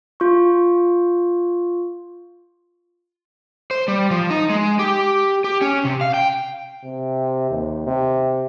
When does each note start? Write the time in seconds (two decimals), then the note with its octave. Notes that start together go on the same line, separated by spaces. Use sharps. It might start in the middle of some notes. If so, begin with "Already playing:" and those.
0.20 F4 C#6
3.71 C5
3.88 G3
4.11 F3
4.30 D#4
4.50 G#3
4.79 G4
5.44 G4
5.62 C#4
5.85 C3
6.01 F5
6.14 G5
6.84 C3
7.50 D#2
7.86 C3